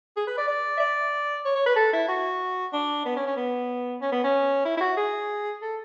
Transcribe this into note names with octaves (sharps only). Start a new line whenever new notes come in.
G#4
B4
D5
D5
E5
D5
C#5
C#5
B4
A4
E4
F#4
D4
B3
C#4
C#4
B3
C#4
B3
C#4
E4
E4
F#4
G#4
A4